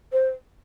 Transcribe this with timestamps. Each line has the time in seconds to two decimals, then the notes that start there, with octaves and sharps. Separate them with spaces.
0.12 C5